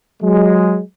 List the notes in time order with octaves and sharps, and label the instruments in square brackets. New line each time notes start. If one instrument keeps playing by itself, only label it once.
[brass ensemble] F#3 G#3